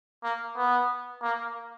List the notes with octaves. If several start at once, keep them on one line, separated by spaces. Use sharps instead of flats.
A#3
B3
A#3